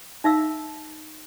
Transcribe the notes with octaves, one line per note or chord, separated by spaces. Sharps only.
D#4 E5 F5 E6